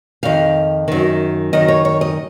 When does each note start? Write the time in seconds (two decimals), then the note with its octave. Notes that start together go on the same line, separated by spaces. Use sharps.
0.23 F2 D#3 F5
0.88 F#2 D#3
1.53 F#2 D#3 D#5
1.68 C#5
1.85 C#5
2.01 D#5